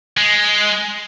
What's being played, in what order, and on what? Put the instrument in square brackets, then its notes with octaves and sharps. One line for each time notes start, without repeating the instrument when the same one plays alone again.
[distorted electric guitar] G#3